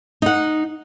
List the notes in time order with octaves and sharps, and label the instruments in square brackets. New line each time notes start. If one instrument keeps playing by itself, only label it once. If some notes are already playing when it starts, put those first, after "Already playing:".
[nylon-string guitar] D#4 F#5